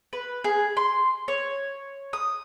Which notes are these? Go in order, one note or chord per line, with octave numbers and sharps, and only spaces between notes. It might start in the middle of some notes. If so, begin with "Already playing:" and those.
B4
G#4
C6
C#5
D#6